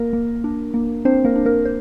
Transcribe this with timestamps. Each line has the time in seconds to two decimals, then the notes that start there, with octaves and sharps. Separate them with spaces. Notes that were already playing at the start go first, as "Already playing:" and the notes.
Already playing: A#3 A#4
0.13 A#3
0.44 D4
0.74 A#3
1.05 C4 D4 C5
1.24 A#3 A#4
1.36 D4
1.45 A#3 A#4
1.65 C5